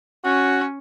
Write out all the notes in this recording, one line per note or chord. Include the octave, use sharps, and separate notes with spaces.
C#4 F#4